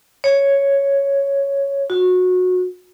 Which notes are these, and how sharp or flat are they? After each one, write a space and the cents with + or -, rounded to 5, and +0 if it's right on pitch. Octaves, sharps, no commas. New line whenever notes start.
C#5 +0
F#4 -20